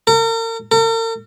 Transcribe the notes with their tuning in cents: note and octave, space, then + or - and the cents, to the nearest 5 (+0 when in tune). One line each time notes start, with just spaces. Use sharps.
A#4 -40
A#4 -45